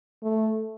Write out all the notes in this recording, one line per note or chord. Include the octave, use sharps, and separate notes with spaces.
A3